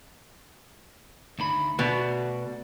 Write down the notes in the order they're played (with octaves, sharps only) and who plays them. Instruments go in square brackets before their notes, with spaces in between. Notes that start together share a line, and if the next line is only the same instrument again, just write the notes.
[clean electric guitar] D2 D#3 B5
[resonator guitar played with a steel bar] B2 [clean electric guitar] A3 F#4 D5